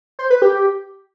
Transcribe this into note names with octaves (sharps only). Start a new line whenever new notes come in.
C5
B4
G4